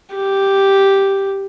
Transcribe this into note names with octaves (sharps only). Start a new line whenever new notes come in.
G4